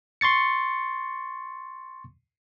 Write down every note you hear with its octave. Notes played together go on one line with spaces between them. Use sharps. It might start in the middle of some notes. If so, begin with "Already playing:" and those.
C6 C#6 A6 C#7